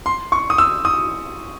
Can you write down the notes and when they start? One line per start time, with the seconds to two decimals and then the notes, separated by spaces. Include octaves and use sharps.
0.06 C6
0.32 C#6
0.50 D#6
0.58 E6
0.85 D#6